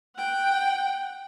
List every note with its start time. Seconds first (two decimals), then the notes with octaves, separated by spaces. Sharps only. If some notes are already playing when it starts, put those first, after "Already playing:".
0.16 F#5 G5